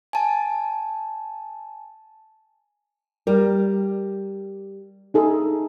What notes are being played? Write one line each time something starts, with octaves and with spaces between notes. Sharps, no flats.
G#5 A5
G3 A#4
D#4 G#4 A4